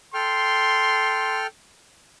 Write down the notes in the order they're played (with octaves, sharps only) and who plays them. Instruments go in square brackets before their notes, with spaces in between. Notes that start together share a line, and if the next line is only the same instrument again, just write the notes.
[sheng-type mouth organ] A4 G5 F6 [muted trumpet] C6